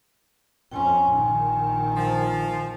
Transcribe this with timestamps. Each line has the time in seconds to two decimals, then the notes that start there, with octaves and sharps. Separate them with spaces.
0.72 F2 C#4 G5 G#5 C6
1.11 A#1 D#3
1.97 F3